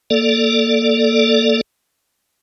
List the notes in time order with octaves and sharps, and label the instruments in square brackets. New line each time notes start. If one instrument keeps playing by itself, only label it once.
[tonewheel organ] A#3 A4 D5